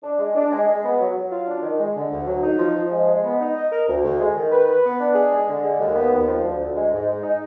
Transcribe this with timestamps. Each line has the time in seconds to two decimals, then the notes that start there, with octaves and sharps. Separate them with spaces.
0.03 D4
0.19 G#3
0.35 D4
0.51 G#3
0.68 G#3
0.84 B3
1.00 F#3
1.16 F#3
1.31 F4
1.47 D4
1.63 D#3
1.79 G#3
1.96 D3
2.12 D2
2.27 F#3
2.43 D#4
2.59 F3
2.76 F3
2.91 G#3
3.08 G#3
3.23 B3
3.40 D#4
3.55 D#5
3.71 A#4
3.88 D2
4.04 D2
4.20 G#3
4.36 D#3
4.51 B4
4.68 B4
4.84 B3
4.99 D4
5.15 G#4
5.31 G#3
5.47 D3
5.63 G#3
5.79 D#2
5.96 B3
6.12 D#2
6.27 F3
6.43 D2
6.59 D2
6.76 G#3
6.92 G#2
7.07 G#3
7.23 D#4